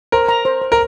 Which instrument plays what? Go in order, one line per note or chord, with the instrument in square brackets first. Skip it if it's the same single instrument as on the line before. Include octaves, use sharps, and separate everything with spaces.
[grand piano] A#4 [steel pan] C5
[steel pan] A#5
C5
C5
[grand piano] A#4